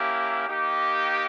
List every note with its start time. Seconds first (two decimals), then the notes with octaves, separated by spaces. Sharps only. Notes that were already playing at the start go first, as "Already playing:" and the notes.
Already playing: A#3 C#4 E4 G4
0.48 A#3 D#4 G4